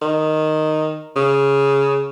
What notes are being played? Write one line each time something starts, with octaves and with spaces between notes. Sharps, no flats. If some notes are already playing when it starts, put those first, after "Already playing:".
D#3
C#3